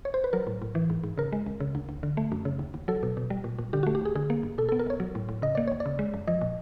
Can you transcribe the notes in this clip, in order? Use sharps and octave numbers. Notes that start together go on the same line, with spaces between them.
C#5
C5
B4
F#3 A#4
A2
A2
E3
G#2
G#2
C#3 A#4
G#3
C#2
C#3
D2
D2
D3
A3
F#2
C#3
D#2
D#2
F#3 A4
B2
B2
G3
A#2
A#2
D3 G4
F#4
A3
G4
D#2 G#4
D3 G#4
A#3
G2
B2 A4
A4
B3
A#4
C2 C#5
F#3
A2
A2
C#3 D#5
A#3 D5
D#2 C#5
D5
C#3
G#3
F#2
F3 D#5
A#2